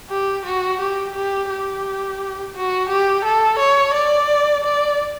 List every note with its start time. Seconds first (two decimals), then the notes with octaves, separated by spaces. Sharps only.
0.10 G4
0.45 F#4
0.80 G4
1.15 G4
1.50 G4
2.55 F#4
2.89 G4
3.25 A4
3.59 C#5
3.94 D5
4.64 D5